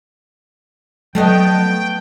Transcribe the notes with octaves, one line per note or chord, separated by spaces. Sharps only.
F#3 A3 B3 D#5 G5